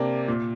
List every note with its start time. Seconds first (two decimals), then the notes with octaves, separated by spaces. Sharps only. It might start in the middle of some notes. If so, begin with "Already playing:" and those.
Already playing: C3 A#3 D4
0.28 A#2